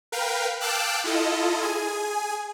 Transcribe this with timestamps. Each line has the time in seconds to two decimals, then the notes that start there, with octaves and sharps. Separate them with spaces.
0.12 A#4 B4 F5 G5
0.60 F5 G5 A5 D6 E6 F#6
1.04 E4 F4 A4 D#5
1.63 G#4 G#5